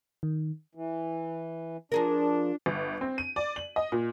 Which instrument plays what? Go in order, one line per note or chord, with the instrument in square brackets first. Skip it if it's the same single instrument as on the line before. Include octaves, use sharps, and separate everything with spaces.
[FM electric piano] D#3
[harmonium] E3
[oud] F3 G#4 A#4 [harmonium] D4
[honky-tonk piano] G1
C4
D#7
D5
F#7
D#5
A#2